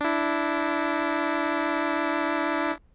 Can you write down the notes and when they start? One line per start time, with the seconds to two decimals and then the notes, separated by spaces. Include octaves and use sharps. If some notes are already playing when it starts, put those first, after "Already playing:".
0.01 D4 E4